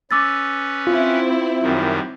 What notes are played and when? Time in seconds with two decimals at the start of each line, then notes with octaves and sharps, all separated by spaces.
0.11 C#4 B4 D6 E6 A6
0.87 C4 E4 F4
1.62 F#2 D#3 G3